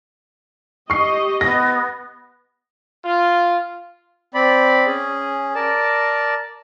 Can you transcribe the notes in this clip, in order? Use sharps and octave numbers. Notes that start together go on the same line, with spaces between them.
G4 D#5 C#6 C7
B3 A#6
F4
C4 D5 B5
C#4 G#4
A#4 D5 A5